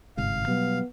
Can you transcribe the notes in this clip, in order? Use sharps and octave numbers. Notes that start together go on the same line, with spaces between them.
G1 G#2 C3 F5
B2 F#3 G3 B3